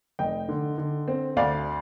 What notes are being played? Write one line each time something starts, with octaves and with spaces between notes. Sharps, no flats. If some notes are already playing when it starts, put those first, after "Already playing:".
F1 D#5 G5
D3
D3
C4
D2 D5 F5